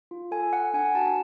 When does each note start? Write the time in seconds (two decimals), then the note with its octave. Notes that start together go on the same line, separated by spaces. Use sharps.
0.11 F4
0.31 A4 G#5
0.53 A4 F#5
0.74 D4 G#5
0.95 F#4 A5